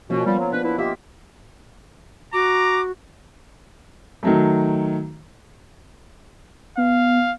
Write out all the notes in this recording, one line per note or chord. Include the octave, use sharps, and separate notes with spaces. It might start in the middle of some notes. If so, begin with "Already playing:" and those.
B2 F3 A#3 C#4
G3 B3 F4
F#3
B3 D4 B4
E4 B4
A#3 F4 G4 D#5 E5
F#4 A#5 D6
D#3 F#3 A3
B3 F5